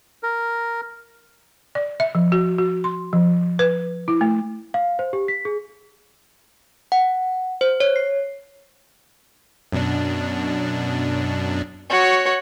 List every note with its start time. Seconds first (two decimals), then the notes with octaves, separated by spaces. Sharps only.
0.23 A#4
1.75 D5
2.00 E5
2.15 F3
2.32 F#4
2.58 F#4
2.84 C6
3.13 F3
3.59 B4
4.08 E4
4.21 A3
4.74 F5
4.99 C5
5.13 G4
5.28 B6
5.45 G#4
6.92 F#5
7.61 C5
7.80 C#5
7.96 C7
9.72 F#2 B2 D4
11.90 F#4 C#5